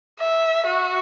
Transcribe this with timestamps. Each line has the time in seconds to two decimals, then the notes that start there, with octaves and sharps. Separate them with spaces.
0.20 E5
0.67 F#4